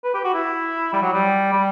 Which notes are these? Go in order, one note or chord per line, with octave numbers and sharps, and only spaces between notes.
B4
G4
F#4
E4
G3
F#3
G3
G3